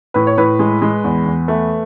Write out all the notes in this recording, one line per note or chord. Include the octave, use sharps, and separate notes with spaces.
A2 B4
C#5
A2 B4
G#3
G#3
E2
E2
A3